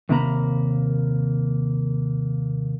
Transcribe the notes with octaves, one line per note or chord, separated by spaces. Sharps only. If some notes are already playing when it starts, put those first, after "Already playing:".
D#2 C3 A#3 A#5 B5